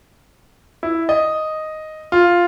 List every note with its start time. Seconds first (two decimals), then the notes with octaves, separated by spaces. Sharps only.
0.83 E4
1.09 D#5
2.12 F4